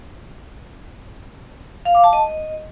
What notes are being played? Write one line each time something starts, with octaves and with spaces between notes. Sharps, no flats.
F5
D6
A5
D#5